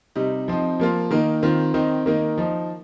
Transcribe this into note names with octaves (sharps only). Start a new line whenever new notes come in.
C3 G3 D#4
F3 C4 D#4
F3 A#3 F4
D#3 A#3 D#4
D#3 C4 F4
D#3 C4 D#4
D#3 A#3 D#4
F3 D#4